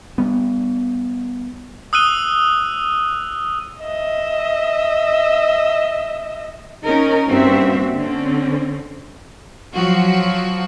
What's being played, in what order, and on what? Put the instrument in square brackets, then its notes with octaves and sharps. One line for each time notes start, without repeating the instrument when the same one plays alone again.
[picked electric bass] G3 B3
[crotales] D#6 E6 F#6 D#7 G7
[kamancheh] D#5 E5
[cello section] C#4 D#4 A#4
G2 A#3 C4 C#4 F#4 E5
D3 C4 C#4
[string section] F3 F#3 F#4